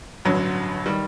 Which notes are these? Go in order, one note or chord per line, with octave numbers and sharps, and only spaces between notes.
A1 G2 D3 F#3
D#3 G3